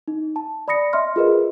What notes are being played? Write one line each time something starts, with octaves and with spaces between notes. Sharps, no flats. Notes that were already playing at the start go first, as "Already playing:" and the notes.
D#4
A5
D5 B5 D#6 A#6 C#7
D#5 E5 C6 F6
F4 G#4 A#4 B4 D#5